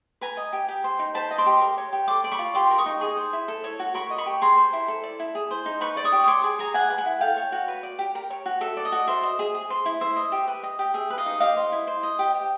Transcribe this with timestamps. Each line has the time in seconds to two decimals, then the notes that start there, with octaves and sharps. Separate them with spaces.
0.21 B4 G#5 A#5
0.37 D#5
0.53 G4
0.69 G4
0.84 C5
0.99 D#4
1.15 C5 A5 B5
1.31 D#5
1.38 C6 D6
1.46 G4
1.61 A#4
1.78 C#5
1.93 G4
2.08 A4 C6 D6
2.24 D5
2.32 B5 C#6
2.39 F4
2.55 G4 C6 D6
2.71 A#4
2.78 C#6 D#6
2.86 D#4
3.01 G#4
3.17 C5
3.33 E4
3.48 A4
3.64 C#5
3.79 F#4
3.94 A#4 B5 C#6
4.10 D#5
4.18 B5 C#6
4.26 G4
4.42 G#4 A#5 C6
4.57 C5
4.73 E4
4.88 A4
5.03 D5
5.20 E4
5.35 G#4
5.51 C5
5.66 D#4
5.81 B4 B5 C#6
5.97 D5
6.04 C#6 D#6
6.12 G4
6.24 D#6
6.27 C#5 C6 D6
6.44 G#4
6.59 G#4 G#5 A#5
6.74 G#4 F#5 G#5
6.90 B4
6.98 F#5 G#5
7.06 E4
7.20 A4 F5 G5
7.37 C#5
7.52 F#4
7.68 B4
7.83 D5
7.99 G4
8.15 A#4
8.30 C#5
8.46 F#4
8.61 A4 E5
8.77 D5
8.85 D#5
8.92 F#4
9.08 C5 E5
9.23 D#5
9.39 G#4
9.55 G#4
9.70 C5
9.86 E4
10.01 C5 E5
10.16 D#5
10.32 G4
10.48 B4
10.63 D#5
10.79 G4
10.94 G#4 E5
11.10 B4
11.18 D#5 F5
11.26 D#4
11.40 G4 D#5 F5
11.56 C5
11.72 E4
11.87 C5
12.03 D#5
12.19 G4
12.34 G4